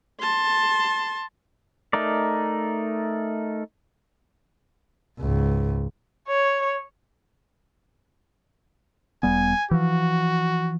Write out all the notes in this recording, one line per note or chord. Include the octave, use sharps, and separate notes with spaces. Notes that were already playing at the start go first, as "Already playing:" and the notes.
A5 C6
A3 D#4 A#4 D5
C#2 G#2
C#5
E1 G3 B3 G#5
E3 F3 F#4